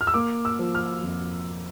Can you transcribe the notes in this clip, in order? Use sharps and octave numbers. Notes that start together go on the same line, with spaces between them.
F6
E6
A#3 D6
E6
F3
F6
F2